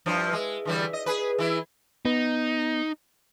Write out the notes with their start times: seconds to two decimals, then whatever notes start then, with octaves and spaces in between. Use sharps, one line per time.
0.06 G2 F3 E4
0.33 G#3
0.65 D3 E3 G3
0.93 D#5
1.06 G#4 B4
1.39 E3 E4
2.05 B3 D#4